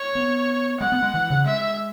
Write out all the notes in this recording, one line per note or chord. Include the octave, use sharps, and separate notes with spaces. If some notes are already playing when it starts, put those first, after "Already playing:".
Already playing: C#5
B3
G#3 F#5
B3
G#3
E3
C#3
G#3 E5